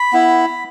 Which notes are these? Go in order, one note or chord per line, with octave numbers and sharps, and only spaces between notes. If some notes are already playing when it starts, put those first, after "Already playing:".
Already playing: B5
B3 E4